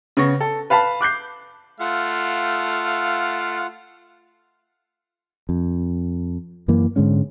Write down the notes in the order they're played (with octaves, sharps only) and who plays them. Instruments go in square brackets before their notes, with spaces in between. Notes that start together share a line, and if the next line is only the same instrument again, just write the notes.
[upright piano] C#3 B3 C#6 A#6
A4
B4 F5 A5 B5
D6 F#6 G6 C7
[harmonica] A3 F5 [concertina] F4 F#5
[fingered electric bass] F2
F#2 E3 A#3
G#2 D3 G#3 C#4